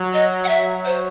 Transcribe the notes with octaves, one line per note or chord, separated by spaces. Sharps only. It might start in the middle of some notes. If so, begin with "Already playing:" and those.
Already playing: F#3
D#5
F#5
F#3 E5
C5